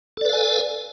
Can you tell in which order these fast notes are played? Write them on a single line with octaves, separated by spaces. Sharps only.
A4 D5 B4 F5 G#5